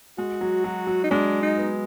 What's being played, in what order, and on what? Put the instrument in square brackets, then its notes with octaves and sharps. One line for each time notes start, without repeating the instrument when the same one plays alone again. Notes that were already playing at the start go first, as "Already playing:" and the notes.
[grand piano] G#3 [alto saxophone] F#4
[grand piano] F#3
F#3
F#3
[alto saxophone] D#4
[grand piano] G#3 [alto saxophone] D4
[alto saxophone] D#4
[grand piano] B3